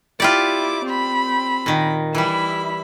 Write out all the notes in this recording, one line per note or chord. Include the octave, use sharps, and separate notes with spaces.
E4 F4 G4 D5 D6
C4 B5
A#2 D#3
E3 G3 E4 B5